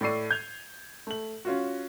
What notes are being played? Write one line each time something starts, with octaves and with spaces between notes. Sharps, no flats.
A2 A4 D5 C#6 C7 D#7
G6 G#6 F7
A3 F#7
C#4 F4 F#4